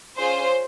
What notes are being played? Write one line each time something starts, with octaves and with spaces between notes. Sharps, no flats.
C#4 F4 G#4 C5